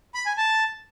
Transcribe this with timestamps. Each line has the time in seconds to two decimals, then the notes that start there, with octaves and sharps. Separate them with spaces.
0.14 B5
0.26 G#5
0.37 A5